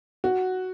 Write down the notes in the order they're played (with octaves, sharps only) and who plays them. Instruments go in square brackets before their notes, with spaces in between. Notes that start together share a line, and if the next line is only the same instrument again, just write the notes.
[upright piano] F#4